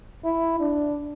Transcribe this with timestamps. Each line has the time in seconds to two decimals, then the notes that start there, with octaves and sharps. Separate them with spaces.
0.25 E4
0.60 D4